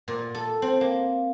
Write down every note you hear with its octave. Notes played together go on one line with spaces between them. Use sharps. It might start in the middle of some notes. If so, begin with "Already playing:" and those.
A#2
A4
C4
A#3